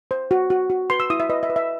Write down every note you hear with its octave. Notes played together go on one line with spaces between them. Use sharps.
C5
F#4
F#4
F#4
B4 C6
E6
E4 D#6
E5
B4 D#5
E5
B4
E5